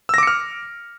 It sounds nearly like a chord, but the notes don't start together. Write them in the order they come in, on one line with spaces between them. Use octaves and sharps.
E6 A#6 D6 C#7 F6